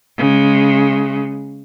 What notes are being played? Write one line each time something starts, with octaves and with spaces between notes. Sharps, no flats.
C#3 G#3